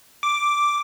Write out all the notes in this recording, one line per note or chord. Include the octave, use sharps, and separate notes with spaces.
D6